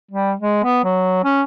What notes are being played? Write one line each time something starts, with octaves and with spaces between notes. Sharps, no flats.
G3
G#3
B3
F#3
C#4